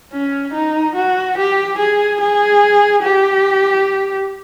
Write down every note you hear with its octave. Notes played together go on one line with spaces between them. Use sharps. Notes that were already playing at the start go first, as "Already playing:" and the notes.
C#4
D#4
F#4
G4
G#4
G#4
G4